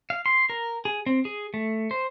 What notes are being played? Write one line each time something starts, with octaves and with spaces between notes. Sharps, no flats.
F5
C6
A#4
G#4
C4
G#4
A3
C5